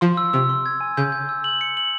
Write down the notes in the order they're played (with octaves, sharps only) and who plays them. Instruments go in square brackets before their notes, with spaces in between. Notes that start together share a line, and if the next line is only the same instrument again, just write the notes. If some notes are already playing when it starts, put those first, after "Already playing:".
[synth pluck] F3 [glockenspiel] C6
[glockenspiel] E6
[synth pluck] C3 [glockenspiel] E6
[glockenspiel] C6
G#6
G#5
[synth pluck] C#3 [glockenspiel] G6
[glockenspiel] G6
E6
F#7
C#7
F#7